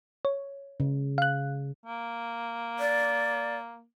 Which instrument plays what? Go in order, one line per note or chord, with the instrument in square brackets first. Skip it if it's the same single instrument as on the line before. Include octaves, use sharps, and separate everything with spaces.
[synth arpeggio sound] C#5
[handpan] C#3
[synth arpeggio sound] F5 F#6
[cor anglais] A#3
[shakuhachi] D5